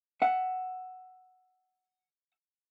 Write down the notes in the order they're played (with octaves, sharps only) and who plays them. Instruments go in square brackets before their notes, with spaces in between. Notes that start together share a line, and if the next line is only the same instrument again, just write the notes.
[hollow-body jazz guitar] E5 F#5